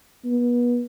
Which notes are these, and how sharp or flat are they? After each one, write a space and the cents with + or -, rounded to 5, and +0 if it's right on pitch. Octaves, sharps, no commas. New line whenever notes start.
B3 -30